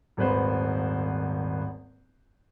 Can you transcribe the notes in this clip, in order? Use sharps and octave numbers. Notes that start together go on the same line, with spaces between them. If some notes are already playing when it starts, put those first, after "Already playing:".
D#1 G#1 B4 C5